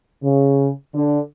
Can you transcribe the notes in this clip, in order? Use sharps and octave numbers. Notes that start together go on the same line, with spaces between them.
C#3
D3